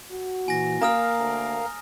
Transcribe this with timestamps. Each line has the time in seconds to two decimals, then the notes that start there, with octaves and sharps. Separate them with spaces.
0.11 F#4
0.48 A#2 E3 G#5 A#6
0.81 A#3 A#4 F5 A#5 D#6 F6
1.18 D2